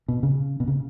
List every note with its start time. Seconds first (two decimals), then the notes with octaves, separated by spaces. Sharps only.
0.08 B2
0.23 C#3
0.60 B2
0.68 C#3